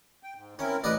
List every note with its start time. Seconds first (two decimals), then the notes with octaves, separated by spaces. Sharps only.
0.23 G5
0.36 G#2
0.59 C4 C#4 E4 A#4
0.84 A1 F2 B4 D5 D#5